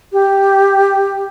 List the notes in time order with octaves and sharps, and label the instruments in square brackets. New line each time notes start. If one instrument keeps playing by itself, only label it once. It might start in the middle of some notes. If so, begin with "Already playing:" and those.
[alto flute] G4